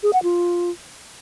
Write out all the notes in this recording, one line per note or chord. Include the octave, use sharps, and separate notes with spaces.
G#4
F#5
F4